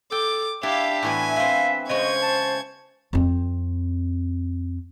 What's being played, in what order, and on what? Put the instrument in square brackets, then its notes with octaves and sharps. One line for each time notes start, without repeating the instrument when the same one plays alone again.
[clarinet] A4 [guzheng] G5 [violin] D6
[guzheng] D4 E4 [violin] G4 F5 [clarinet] E5
[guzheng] A2 E3 B3 [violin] G#5
[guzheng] B3 C4 [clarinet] E5 [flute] F5
[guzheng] C#3 G#3 C#4 [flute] C5 [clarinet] D#5 [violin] C#6 G#6
[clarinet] A5
[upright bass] F2 C4